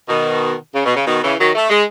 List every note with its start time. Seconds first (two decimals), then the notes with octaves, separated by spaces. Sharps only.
0.08 B2 D#3
0.74 C#3
0.85 B2
0.96 C#3
1.06 B2 D#3
1.23 C#3 E3
1.40 D#3 F#3
1.55 A3
1.70 G#3